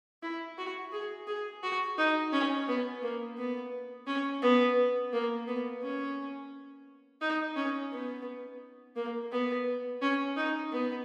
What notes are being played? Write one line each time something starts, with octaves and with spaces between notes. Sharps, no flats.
E4
F#4
G#4
G#4
F#4
D#4
C#4
B3
A#3
B3
C#4
B3
A#3
B3
C#4
D#4
C#4
B3
A#3
B3
C#4
D#4
B3